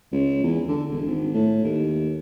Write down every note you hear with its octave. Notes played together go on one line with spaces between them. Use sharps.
C#2
E2
D3
E1
G#1
A2
D#2